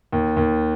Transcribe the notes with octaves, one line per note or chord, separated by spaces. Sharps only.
D#2
D#2